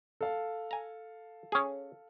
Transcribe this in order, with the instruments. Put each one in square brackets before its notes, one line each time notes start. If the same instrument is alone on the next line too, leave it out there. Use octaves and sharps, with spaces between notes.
[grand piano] A4 F5
[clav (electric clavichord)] G#5 A#5
C#4 G#4